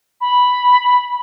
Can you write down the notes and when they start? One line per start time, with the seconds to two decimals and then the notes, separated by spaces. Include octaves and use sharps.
0.21 B5